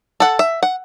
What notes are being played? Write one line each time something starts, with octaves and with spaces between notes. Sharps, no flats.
A4 F#5
E5
F#5